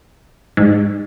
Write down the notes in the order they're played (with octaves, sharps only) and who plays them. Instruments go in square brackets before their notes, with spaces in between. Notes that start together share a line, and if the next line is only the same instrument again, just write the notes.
[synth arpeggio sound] G#2